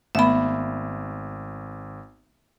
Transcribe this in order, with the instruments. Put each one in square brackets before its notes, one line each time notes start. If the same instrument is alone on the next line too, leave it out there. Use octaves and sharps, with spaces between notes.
[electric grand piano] G#1 [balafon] A3 B3 [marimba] E5 B5